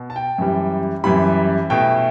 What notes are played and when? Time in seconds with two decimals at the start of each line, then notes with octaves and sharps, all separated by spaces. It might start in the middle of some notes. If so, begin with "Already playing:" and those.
Already playing: B2
0.10 A5
0.16 G5
0.38 F#2 E3 G3
1.04 F#2 E3 G3 B5
1.70 B2 A3 E4 G5